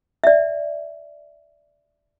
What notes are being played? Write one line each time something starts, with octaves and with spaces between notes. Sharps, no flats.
D5 E5